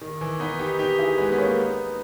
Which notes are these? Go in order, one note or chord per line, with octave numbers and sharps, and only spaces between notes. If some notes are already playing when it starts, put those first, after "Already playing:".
D#3
E3
B3 D#4
D#4 G4
D#4 G4
E4 G#4
G#3 B3
B3
A#3 C#4
B3 D#4